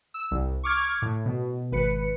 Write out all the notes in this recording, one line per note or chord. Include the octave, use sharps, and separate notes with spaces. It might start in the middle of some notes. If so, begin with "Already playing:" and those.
E6
C2
C#6 D6 F6 G#6
A2
B2
G#1 B4 C#7